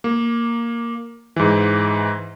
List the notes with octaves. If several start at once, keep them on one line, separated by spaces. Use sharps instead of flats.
A#3
G#2 E3